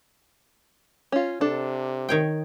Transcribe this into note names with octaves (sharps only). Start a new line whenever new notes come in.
C#4 F4
C3 D4 A4
D#3 C#5 G5